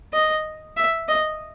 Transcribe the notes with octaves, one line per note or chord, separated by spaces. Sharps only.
D#5
E5
D#5